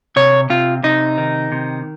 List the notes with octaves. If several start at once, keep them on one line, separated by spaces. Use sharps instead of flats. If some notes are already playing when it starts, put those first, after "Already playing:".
C3 C#5
C3 F4
C3 D#4
D#3
C3